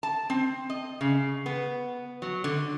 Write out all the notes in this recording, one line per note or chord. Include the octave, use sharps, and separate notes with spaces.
A5
C4
D#5
C#3
B3
F#3
D3